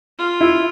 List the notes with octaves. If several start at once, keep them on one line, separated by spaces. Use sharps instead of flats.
F4
E4